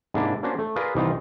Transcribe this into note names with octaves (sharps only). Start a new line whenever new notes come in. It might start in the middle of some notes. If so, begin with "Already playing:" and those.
G#2 C3 A#3 D4 E4
A#3 C#4 D4 F4 F#4 C5
A3
F4 G#4 A#4 B4 D5 F5
C2 D#3 E3 D#4 F4